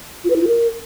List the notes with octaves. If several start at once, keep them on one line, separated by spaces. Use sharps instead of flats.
F4
B4
E4
F4
A#4